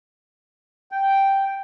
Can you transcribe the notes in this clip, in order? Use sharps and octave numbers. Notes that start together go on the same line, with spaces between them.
G5